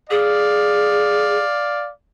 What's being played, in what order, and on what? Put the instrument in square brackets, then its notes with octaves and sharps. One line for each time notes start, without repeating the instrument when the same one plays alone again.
[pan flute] G#4 [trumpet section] D5 F5